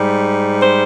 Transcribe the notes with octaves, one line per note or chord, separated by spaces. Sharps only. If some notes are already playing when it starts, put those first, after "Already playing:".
Already playing: G#2 G3
C5